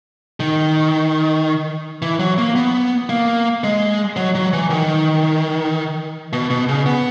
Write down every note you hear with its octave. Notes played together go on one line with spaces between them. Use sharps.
D#3
E3
F#3
A#3
B3
A#3
G#3
F#3
F#3
E3
D#3
B2
B2
C#3
B3